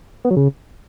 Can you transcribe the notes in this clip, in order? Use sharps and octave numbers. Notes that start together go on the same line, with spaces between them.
B3
F#3
C#3